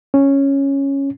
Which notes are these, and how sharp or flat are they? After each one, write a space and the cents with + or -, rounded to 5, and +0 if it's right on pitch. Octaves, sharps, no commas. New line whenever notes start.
C#4 -5